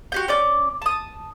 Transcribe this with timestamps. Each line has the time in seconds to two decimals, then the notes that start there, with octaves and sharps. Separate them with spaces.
0.12 F#4 G4 G5
0.28 C#4 D5 D6
0.82 A5 D#6